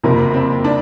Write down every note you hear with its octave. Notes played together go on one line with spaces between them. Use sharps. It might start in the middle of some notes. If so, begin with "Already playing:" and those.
F#1 F2 C3 F3 A#3
C4
D4